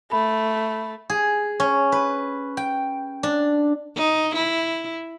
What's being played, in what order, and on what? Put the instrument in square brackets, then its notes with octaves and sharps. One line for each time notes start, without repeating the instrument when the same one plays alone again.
[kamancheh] A3 [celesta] B5
[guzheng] G#4
C#4
B4
G5
D4
[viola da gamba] D#4
E4